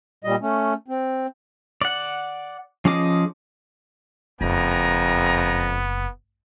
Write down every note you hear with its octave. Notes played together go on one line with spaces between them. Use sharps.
A#2 G3 D#5
A3 C#4
C4
D5 F#5
F3 C#4 G#4 D#5 D6
F#1 F2 B3 G5 G#5 A#5